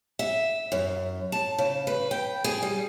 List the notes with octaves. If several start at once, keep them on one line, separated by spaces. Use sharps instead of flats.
E5
F#2
A5
C#3
B4
G5
G#4
G3